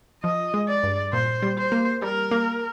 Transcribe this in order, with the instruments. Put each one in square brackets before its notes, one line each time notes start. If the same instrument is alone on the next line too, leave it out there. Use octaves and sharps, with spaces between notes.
[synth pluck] F3 [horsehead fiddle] D#5
[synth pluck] G#3
[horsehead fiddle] D5
[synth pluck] G2
[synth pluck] A#2 [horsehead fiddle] C5
[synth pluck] G3
[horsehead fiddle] C5
[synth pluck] A#3
[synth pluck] G3 [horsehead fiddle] A#4
[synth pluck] A#3